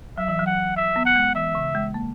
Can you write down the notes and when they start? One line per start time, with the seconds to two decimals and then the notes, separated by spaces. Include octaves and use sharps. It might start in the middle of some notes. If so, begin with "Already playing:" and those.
0.18 F#3 E5
0.28 E3
0.39 F#3
0.46 F#5
0.77 E5
0.96 B3
1.06 F#5
1.16 G#3
1.35 E3 E5
1.55 C#3
1.75 G#3
1.94 A#3